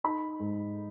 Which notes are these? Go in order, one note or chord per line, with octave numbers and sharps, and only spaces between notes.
D#4 B5
G#2